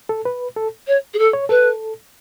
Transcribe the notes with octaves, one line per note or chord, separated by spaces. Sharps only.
A4
B4
A4
C#5
G#4
A4
C#5
A4 B4